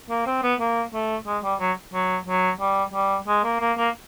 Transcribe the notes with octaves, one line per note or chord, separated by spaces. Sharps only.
A#3
C4
B3
A#3
A3
G#3
G3
F#3
F#3
F#3
G3
G3
G#3
A#3
A#3
A#3